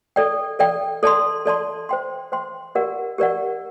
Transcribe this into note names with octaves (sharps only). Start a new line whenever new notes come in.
A4 D5 G5
A4 D5 G5
A4 D5 A5 C6
A4 D5 A5 C6
C5 G5 C6
C5 G5 C6
G4 A#4 D5 F#5
G4 A#4 D5 F#5